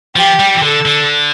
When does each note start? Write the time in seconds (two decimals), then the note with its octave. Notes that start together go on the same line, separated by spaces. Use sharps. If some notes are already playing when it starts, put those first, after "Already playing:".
0.15 F3 G4
0.39 G3
0.55 E3
0.62 D3 A4
0.86 D3